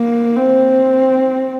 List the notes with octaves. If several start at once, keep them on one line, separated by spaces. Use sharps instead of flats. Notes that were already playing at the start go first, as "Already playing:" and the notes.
Already playing: A#3
C4